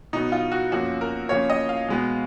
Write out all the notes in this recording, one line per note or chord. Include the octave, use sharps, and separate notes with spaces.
B2 F#3 B3 D#4
F4
F#4
F#2 F3 A#3 C#4 F#4
A#4
C#3 F3 A#3 C#5
D#5
F5
B2 G#3 B3